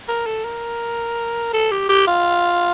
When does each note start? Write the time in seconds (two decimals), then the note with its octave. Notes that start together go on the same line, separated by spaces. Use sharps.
0.08 A#4
0.26 A4
0.44 A#4
1.53 A4
1.71 G4
1.89 G4
2.07 F4